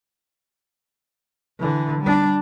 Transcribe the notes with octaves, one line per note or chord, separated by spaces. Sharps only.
D3 E3
G3 D4